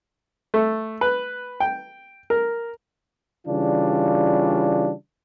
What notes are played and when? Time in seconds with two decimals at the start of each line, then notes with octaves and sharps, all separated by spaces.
0.54 A3
1.01 B4
1.60 G5
2.30 A#4
3.47 C#3 E3 G3 D4 F4